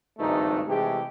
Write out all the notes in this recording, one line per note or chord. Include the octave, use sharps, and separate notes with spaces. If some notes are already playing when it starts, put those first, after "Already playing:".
G#1 C#2 G2 A3 D#4
C3 E3 G#3 A3 G4 G#4